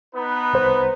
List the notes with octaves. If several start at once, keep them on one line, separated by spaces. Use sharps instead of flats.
B3 D#4 B4
C2 C5